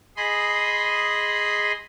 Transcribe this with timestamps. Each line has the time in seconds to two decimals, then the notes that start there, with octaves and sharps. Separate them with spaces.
0.17 G#4 D#5 B5 C6